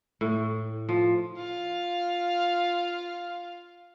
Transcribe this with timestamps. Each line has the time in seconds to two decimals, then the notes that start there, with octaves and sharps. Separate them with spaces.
0.21 A2
0.89 F3
1.37 F4 F5